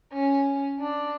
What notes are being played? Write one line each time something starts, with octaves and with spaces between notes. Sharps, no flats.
C#4
D4